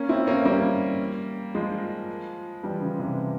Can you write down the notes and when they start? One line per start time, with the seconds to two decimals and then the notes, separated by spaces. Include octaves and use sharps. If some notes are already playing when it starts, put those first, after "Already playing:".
Already playing: A#3 C#4
0.09 C4 E4
0.27 A#3 C#4
0.45 G3 A#3
1.55 F3 G#3
2.63 E3 G3
2.81 C#3 F3
2.99 C3 E3